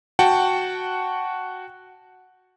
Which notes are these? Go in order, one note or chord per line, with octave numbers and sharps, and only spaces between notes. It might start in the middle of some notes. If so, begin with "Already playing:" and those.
F#4 F#5 G5 A5